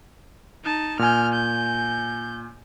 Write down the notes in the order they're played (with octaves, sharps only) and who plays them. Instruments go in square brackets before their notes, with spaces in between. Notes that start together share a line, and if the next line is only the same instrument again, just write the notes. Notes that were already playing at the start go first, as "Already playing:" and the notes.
[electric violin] D#4 A5
[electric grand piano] A#2 G#5 [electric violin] F6 G6
[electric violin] G6